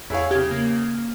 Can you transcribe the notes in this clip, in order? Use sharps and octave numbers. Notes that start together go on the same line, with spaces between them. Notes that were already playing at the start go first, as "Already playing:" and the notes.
E2 E4 G#4 C#5 F5
C#3 G4 G#6
A#3